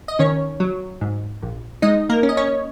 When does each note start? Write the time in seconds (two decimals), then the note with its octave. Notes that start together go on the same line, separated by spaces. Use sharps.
0.08 D#5
0.19 D#3 C#4 C#5
0.60 F#3
1.01 G#2
1.42 A#1
1.82 G#3 D#4 D#5
2.09 A#3 A#4
2.23 C#4
2.29 D#5
2.37 C#4 C#5